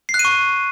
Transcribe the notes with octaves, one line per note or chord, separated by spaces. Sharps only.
C7
F#6
D#7
C#6